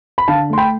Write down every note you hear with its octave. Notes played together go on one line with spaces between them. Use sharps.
B5
D3 F5 A5
A3 C6
G5 B5